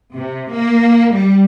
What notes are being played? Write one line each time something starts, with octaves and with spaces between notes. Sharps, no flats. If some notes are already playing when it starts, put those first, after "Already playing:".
C3
A#3
G3